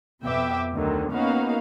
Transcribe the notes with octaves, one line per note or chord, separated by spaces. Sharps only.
F2 B2 B3 E5 G5 D6
D2 D3 D#3 F#3
A#3 B3 C#4 D#4 F#4 F5